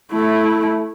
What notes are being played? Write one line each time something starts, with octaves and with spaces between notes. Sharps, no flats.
A3 E4